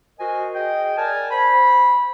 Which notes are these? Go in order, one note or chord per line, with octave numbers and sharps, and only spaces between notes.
F#4 A#4 C5 D#5 G#5
G#4 D#5 G5
A#4 D5 G#5 A5
C5 B5